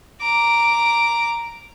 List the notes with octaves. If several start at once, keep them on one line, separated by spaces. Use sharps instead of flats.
A#5 D6